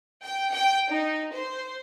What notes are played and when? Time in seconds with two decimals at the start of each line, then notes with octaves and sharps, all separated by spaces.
0.23 G5
0.52 G5
0.89 D#4
1.32 C5